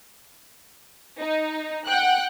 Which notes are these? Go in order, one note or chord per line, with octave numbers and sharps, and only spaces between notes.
D#4
F#5 G5 F#6